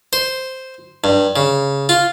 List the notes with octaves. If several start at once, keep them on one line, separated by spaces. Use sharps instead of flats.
C5
G2
C#3
F4